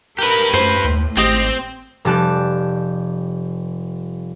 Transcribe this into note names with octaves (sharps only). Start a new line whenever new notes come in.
G4 A#4 B4 B5
F#2 A2 C5
D#2
G#1 C4 G4 D#5
F1 G3 G4 A5 F#6